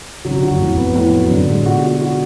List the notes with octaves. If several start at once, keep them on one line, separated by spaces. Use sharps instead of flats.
D3 F#3
C#3
D3 F#4
F#2
F2 A2
F2 B3
F2 A2
F#3
F#2 D3
A2 G#3
B2 F#4
F#4
F#4